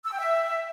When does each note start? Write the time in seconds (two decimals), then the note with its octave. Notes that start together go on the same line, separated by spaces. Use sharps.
0.05 E6
0.12 G5
0.19 E5